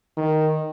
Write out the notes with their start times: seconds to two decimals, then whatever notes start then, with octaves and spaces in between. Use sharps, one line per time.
0.17 D#3